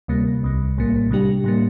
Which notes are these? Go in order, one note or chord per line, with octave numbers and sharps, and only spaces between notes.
D2 C3 G3 A#3
C2 C3 G3
A#1 A2 G3 A#3
C3 G3 D4 G4
A2 G3 A#3